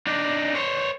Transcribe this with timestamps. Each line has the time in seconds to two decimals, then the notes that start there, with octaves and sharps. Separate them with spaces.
0.07 D4 D#4
0.55 C5 C#5